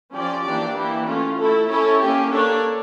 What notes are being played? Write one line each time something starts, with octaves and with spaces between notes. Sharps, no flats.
F3 C#4 G4 D5
E3 A#3 D4 G4 D5
E3 A#3 E4 G4
A3 C#4 F4
A3 E4 A4
C#4 E4 A4 C#5
A#3 C#4 G4
A#3 D4 A4 C#5